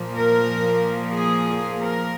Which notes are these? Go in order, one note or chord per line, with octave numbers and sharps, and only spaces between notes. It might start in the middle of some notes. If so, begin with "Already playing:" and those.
Already playing: A#2 F3 A#3
A#4
G#4
A#4